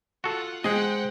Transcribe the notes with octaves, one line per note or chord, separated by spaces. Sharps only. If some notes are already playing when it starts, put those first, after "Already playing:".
F4 F#4 A4 F#5
G#3 G#4 C5 D#5 F#5 G5